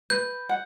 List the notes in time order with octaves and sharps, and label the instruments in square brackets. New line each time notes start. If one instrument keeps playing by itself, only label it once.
[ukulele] B4 [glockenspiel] G6
[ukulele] F#5